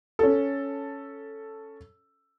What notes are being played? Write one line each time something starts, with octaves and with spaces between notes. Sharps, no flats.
C#4 A4